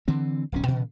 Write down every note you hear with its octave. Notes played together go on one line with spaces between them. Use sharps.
D3 E3 C4
D1 B1 C#4
A#2 C#3 E3